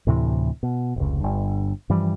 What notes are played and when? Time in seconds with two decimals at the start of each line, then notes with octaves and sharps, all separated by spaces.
0.07 D2 A2 C3 E3
0.63 B2
0.96 F1 C#2
1.20 G1 G2
1.89 G2 E3 F3 G3